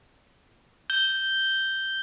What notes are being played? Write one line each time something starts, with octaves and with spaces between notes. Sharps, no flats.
G6 G7